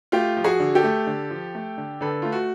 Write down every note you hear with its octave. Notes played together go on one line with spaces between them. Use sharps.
A3 F4 G4
F3
F#4 G#4
D3
G4 A4
A3
D3
F3
A3
D3
D3 A4 B4
A3 F4
F#4